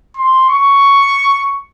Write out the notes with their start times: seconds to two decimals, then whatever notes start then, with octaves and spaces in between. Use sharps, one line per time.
0.17 C6
0.50 C#6